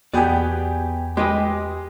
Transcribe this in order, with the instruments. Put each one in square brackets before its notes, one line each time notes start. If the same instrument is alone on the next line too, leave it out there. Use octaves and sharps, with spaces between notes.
[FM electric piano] E2 G5 G#5 [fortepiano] B2 G4 [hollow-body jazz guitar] B3 G#4 D5
[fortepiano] G#3 [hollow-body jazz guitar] G4 B4 D#5